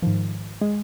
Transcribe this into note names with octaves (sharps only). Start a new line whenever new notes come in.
G#2 D#3 F3
G#3